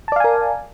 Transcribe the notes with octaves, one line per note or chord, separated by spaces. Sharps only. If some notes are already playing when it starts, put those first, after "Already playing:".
A#4 D5 F5 G#5 A5